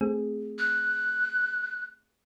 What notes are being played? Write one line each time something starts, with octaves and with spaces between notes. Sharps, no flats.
A3 C4 G#4
F#6